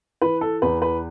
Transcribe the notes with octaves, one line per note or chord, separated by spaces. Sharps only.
E3 B4
A4
E2 B4
B4